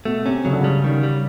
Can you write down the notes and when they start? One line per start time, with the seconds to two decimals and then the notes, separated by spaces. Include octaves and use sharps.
0.05 B2 A3
0.25 C3 C#4
0.45 C#3 F#3
0.53 D3
0.61 C#3 G3
0.84 D#3
1.03 G3